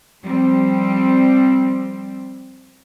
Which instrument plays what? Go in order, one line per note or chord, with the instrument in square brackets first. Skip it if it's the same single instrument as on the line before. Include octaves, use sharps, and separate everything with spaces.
[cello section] F3 G3 C4